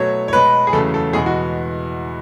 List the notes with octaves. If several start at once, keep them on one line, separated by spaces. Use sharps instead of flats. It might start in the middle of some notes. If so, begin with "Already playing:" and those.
Already playing: B2 F#3 A3 C#5
C#5
B2 G#3 B4
G#4
E2 C#3 F#3 A3 A4
A4
E2 B2 G#3 G#4
F#4